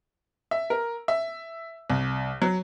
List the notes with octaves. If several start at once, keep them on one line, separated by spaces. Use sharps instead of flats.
E5
A#4
E5
C2
F#3